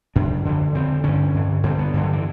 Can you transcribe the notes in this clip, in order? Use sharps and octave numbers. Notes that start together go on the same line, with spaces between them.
F#2 C#3 D4
F2 D3
F2 D3 C4
G2 D3 C#4
G2 D3
G2 D3 C4
B3
G2 D3
F#3
E3